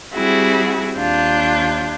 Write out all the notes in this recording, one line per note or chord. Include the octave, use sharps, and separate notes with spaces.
G3 C4 E4 F#4 G#4
D#2 D4 F4 G6